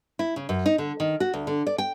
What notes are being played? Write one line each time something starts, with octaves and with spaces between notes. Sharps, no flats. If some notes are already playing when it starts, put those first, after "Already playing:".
E4
C#3
F#2
D#4
D3
D#3
F#4
D2
D3
D5
G5